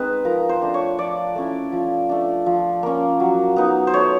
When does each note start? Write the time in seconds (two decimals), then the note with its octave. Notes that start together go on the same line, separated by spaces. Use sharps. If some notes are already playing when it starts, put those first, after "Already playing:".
Already playing: G#3 C4 D#4 B4
0.25 F3 A#4
0.49 C5
0.62 A3 D4
0.74 C#5
0.98 F3 D5
1.35 A3 C#4 E4
1.72 F3
2.09 A3 D4
2.46 F3
2.83 A#3 C#4
3.20 F#3
3.56 B3 D#4
3.87 C5
3.94 A3 C#5